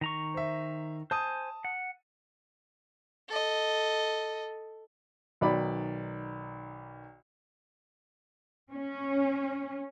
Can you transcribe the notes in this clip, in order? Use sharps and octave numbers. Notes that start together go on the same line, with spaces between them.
D#3 A#5 C#6
C5 E5
C5 G#5 A5 D#6
F#5
A4 D#5
B1 D#3 D5 B5
C#4